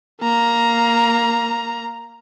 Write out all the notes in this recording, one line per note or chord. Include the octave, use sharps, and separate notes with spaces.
A#3 A#5